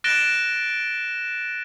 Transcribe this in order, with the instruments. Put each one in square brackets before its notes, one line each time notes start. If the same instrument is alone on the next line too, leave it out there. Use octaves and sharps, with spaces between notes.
[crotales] F#6 A6 A#6 D7 E7 G7